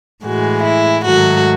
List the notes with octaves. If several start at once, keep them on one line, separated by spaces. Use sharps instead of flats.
A2 E3 G#3 F#4
E4
G#2 D#3 F#3 A3 F#4